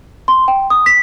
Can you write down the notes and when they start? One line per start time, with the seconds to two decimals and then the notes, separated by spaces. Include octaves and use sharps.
0.28 C6
0.48 G5
0.70 D#6
0.86 B6